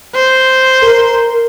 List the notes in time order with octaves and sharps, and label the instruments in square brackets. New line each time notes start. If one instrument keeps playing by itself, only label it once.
[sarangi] C5
[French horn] A#4